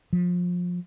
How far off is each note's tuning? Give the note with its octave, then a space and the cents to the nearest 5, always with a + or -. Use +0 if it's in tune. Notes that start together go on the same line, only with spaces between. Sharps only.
F3 +25